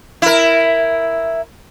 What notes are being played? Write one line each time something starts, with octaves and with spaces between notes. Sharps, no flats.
E4 A#4